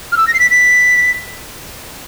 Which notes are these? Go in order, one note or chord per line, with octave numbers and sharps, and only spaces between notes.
F6
E6
A#6
C7
B6
B6